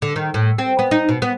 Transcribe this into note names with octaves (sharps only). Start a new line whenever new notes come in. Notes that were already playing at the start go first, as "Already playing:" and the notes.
D3
D#3
A2
C4
B3
D#4
B2
B3